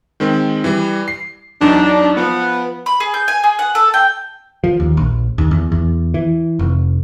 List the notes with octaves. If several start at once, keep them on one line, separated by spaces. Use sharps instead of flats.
D#3 G#3 C4
E3 G3
C7
E2 F#3 D4 D#4
F3 B3
B5
G#4
G6
G#5
G#4
F#5
A4
G5
F3
D#2
A#1
D#2
E2
E2
E3
F1